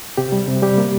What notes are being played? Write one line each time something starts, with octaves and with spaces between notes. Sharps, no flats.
C3 G4
G3
C3
G3 G4
A#3